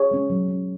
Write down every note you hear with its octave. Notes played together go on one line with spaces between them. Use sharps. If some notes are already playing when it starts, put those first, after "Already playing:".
Already playing: G#4 C#5
G#3 C#4
F#3
C#4